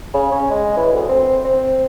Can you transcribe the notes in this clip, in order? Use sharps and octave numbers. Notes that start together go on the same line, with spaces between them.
C#3
C#4
G#3
E3
D2
C4
C4